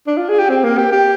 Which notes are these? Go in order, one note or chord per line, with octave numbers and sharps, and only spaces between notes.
D4
F4
G#4
G4
C4
A#3
G4
G4